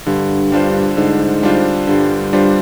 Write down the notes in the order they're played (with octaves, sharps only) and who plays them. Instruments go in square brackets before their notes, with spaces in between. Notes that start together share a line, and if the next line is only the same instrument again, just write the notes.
[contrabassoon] G2 [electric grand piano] D3
[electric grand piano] G3 D4 F4 C5
[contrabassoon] G#2 [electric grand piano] D3
[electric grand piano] G3 D4 F4 C5
[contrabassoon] G2 [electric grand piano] D3
[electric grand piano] G3 D4 F4 C5